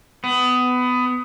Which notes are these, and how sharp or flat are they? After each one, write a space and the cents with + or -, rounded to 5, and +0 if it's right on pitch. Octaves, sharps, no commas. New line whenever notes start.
B3 +20